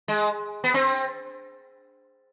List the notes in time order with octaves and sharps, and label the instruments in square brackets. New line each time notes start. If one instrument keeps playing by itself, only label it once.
[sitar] G#3
B3
C4